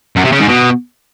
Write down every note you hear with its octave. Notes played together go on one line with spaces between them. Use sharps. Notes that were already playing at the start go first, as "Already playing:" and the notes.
F#2
C3
C#3
G#2
B2